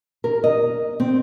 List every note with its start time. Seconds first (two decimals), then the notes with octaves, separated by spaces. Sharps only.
0.24 A#4
0.44 D#5
1.00 C4